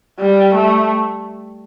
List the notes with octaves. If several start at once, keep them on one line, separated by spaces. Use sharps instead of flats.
G3
A3